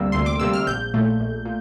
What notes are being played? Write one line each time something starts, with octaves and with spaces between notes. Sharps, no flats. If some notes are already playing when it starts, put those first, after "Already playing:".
Already playing: D2 C3 G3 A#3 E6
D2 C6
D6
C3 G3 A#3 E6
F6
A#1 G6
A#2 A3
A#1
A#2